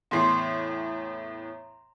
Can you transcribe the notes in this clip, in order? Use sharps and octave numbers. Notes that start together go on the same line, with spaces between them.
E2 A2 A#5 C6 C7